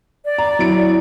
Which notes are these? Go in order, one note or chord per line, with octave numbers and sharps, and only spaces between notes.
D5
A#5
F#3 E4 D7